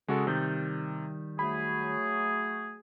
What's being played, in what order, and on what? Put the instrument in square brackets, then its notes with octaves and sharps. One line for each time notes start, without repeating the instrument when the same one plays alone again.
[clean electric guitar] C#3 [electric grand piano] G#3 F#4 A4
[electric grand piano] C3 [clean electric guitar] D#3 G3
[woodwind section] F#3 A3 G#4 [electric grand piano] B5